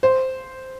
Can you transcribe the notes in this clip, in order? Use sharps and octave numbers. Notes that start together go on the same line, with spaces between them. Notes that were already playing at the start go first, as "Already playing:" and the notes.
C5